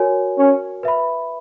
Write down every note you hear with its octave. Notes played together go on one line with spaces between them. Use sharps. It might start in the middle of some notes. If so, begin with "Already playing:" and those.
Already playing: F#4 A#4 C#5 G#5
C#4
B4 E5 B5